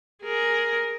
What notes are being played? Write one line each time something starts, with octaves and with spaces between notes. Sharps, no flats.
G#4 A#4